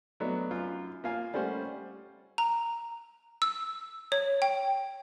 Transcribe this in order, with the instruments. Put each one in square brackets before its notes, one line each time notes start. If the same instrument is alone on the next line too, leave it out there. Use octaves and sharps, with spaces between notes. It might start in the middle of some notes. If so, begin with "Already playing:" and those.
[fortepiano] F#3 A3 B3 D4 D#4
F#2 F4
A#3 F4 F5 G#5
G3 A3 C#4 C5 F#5
[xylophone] A#5
E6
C#5
G5